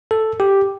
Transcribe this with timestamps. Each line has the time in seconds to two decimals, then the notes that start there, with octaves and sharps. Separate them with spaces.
0.11 A4
0.40 G4